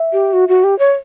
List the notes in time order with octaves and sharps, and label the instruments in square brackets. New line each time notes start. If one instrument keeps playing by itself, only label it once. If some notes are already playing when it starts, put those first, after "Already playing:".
Already playing: [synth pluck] E5
[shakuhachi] G4
F#4
F#4
G4
C#5